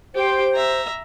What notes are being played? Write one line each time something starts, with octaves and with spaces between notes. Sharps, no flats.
G4 C5 G5
E5 A#5